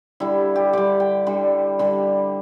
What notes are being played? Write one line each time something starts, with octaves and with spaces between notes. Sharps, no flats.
D3 G3 E4
G4
D3 G3 D5
G5
D3 G3
D3 G3